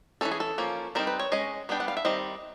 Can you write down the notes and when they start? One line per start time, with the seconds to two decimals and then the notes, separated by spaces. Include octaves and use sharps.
0.21 E3 G#3 C#4 A4
0.31 G#4
0.40 A4
0.58 F3 A#3 C#4
0.95 G3 C4 D#4 A#4
1.07 B4
1.19 C#5
1.32 G#3 C#4 D#5
1.69 G3 B3 D4 G5
1.80 F#5
1.88 F5
1.97 E5
2.05 D#3 G3 C4 D#5